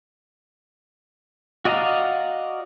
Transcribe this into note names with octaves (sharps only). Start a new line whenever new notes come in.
F#4 D5 D#5 F5 A#5